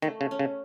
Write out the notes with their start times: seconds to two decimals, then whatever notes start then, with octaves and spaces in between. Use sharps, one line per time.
0.02 D#3 A3
0.21 C#3
0.31 C#4
0.39 C#3